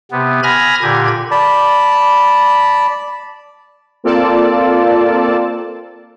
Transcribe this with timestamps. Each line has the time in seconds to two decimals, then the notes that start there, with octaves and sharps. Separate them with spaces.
0.11 C3 B3
0.43 G#5 B5 F6 G#6 A#6
0.82 A#2 D3 G4 G#6
1.31 D5 A5 B5
4.04 A#3 C4 F4 A4 D5 A5